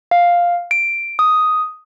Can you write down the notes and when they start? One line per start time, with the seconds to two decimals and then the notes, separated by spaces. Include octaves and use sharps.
0.11 F5
0.71 D7
1.19 D#6